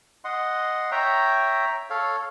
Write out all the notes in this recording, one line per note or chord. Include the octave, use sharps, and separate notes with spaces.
D#5 F#5 C6
C#5 E5 G5 A#5
A4 C#5 F5